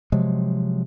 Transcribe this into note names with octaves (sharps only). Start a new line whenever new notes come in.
C3 F3 F#3 G#3